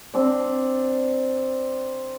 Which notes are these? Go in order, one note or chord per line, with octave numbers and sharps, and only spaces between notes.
C4 D4 D5